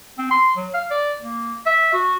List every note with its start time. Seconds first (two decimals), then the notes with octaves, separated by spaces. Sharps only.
0.18 C4
0.31 C6
0.56 F#3
0.74 F5
0.91 D5
1.21 A#3
1.66 E5
1.93 F#4